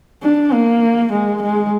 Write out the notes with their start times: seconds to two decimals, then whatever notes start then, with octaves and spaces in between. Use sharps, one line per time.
0.23 D4
0.53 A#3
1.12 G#3
1.42 G#3